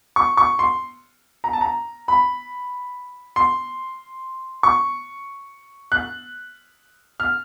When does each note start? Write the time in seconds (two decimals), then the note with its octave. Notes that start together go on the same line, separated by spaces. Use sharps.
0.16 C#6
0.37 C#6
0.59 C6
1.44 A#5
1.53 A5
1.61 A#5
2.08 B5
3.36 C6
4.63 C#6
5.92 F#6
7.20 F6